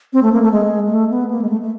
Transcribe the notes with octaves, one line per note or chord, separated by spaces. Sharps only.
C4
A3
A#3
A3
G#3
A#3
A3
B3
A#3
G#3
A3
A3